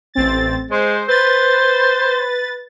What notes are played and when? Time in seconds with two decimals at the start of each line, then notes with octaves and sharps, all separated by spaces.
0.14 A1 C4 A6
0.71 G#3 C5
1.08 B4 C5 A6